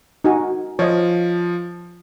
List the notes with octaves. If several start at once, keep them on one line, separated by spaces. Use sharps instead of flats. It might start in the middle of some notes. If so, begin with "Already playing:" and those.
D#4 F#4 G#5
F3 C#5 D#5